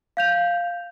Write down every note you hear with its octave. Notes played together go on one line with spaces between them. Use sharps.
F5 G6 F7